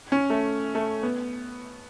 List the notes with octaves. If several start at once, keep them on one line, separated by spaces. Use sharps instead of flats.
C#4
A3
A3
B3